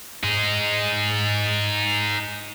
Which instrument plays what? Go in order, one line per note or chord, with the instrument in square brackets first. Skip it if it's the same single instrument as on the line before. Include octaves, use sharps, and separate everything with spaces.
[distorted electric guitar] D#4 G#4